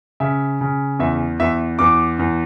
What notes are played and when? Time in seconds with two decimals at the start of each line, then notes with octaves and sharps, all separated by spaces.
0.20 C#3 E5
0.61 C#3
0.99 E2 E5
1.40 E2 E5
1.79 E2 D6
2.19 E2